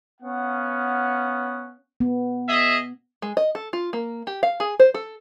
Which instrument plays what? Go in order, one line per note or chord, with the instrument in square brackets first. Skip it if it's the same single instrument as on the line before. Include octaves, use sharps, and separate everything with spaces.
[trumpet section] B3 C#4 F5 F#5
[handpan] B3
[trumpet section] G#4 D#5 E5
[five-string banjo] G#3
D#5
A4
F4
A#3
G4
F5
G#4
C5
A4